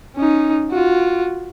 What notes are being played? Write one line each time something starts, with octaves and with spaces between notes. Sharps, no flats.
C#4 D#4
F4 F#4